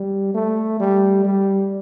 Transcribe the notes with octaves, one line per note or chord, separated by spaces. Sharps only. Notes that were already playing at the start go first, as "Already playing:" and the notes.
Already playing: G3
A3
G3
G3